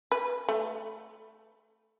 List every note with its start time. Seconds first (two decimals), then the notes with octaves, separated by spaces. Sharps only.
0.12 B4
0.49 A3